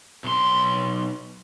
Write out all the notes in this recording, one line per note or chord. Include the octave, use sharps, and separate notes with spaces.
B1 C6